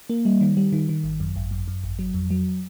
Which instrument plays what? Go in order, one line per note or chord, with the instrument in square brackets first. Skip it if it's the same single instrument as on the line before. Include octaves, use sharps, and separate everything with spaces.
[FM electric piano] A#3
G3
D#3
G3
D#3
D#3
G#1
F#2
G#1
F#2
F#2
G#1
F#3
F2
F#3